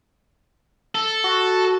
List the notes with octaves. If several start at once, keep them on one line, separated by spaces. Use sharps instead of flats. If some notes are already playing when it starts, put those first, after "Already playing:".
A4
F#4